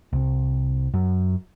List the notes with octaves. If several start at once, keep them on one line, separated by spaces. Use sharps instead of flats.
C2
F#2